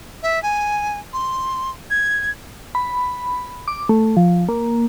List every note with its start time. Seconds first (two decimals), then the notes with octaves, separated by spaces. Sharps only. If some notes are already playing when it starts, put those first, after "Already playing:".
0.22 E5
0.42 G#5
1.13 C6
1.90 G#6
2.75 B5
3.68 D6
3.89 A3
4.17 F3
4.49 A#3